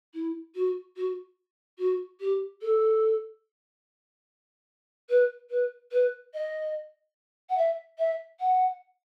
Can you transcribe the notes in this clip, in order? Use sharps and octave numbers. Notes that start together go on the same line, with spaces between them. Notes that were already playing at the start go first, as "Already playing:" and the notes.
E4
F#4
F#4
F#4
G4
A4
B4
B4
B4
D#5
F#5
E5
E5
F#5